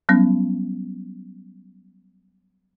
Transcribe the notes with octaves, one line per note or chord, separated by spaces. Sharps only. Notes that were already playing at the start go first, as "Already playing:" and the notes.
F#3 G3 B3 C#4